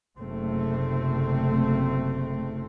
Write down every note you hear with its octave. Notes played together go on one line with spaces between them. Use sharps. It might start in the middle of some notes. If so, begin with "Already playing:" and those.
F#1 C3 A3 C4